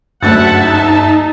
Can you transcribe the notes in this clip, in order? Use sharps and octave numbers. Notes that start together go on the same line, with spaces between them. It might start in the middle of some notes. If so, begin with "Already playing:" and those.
F#1 D2 G2 E5 F#5 A5 A6
D#4